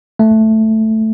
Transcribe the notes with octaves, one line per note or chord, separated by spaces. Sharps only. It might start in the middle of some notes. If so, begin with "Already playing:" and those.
A3